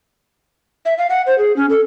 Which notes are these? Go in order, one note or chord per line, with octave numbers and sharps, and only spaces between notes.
E5
F5
F#5
C5
G#4
C#4
A4